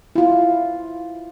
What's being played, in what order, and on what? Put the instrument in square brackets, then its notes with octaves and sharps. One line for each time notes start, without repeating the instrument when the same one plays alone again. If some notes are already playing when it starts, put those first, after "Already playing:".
[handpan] E4 F4